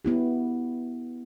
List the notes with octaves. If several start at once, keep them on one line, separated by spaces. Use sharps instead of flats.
B3 E4 G4